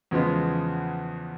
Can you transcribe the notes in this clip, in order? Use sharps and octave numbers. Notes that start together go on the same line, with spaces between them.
E2 C#3 F3 G#3 B3